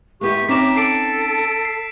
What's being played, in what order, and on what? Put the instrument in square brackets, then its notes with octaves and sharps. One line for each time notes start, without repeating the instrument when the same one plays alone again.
[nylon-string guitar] G#3 B3 E4 [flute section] G4 C#6
[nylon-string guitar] C4 C#4 D#4 [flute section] A#5 D6 [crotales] B6 E7
[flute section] A4 [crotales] C7 D7
[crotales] C7